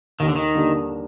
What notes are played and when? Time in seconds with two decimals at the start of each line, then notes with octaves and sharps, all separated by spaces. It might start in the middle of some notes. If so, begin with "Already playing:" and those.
0.20 D#2 D#3
0.28 D3
0.36 D#3
0.55 D3 G3 A#3 D4